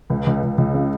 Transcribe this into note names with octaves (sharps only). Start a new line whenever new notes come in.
C#2
C#2
C#2
C#2
C#3